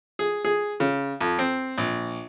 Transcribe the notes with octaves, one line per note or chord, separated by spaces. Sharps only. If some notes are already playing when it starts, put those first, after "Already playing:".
G#4
G#4
C#3
F2
C4
A#1